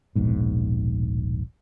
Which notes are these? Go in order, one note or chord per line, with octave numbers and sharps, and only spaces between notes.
D#1 A#1 G#2 B2